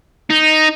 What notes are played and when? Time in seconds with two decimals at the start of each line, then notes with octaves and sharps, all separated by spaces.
0.30 D#4